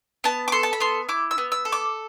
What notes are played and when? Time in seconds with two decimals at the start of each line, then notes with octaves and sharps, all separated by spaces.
0.24 B3 A5
0.48 D6
0.52 A4 C6
0.63 A5
0.73 B5
0.80 B3 C6
1.09 E4 D6
1.31 E6
1.38 B3
1.52 E6
1.65 A4
1.72 D6